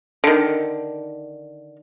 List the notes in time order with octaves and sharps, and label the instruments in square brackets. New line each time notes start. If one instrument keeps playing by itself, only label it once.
[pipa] D3 D#3